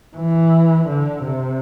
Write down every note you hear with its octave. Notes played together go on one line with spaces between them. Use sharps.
E3
D3
C3